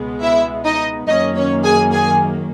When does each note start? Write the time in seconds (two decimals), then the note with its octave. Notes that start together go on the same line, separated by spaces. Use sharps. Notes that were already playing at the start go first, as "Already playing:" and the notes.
Already playing: C#2 B2 G#3 B3
0.22 E4 E5
0.65 D#4 D#5
1.08 F#2 D#3 A#3 C#4 D#4 D#5
1.36 C#4 C#5
1.64 G#4 G#5
1.92 G#4 G#5